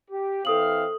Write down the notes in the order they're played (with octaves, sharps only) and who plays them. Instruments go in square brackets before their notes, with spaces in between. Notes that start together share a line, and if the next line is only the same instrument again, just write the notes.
[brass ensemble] G4
[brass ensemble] E3 C4 F5 [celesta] A4 D#6 F#7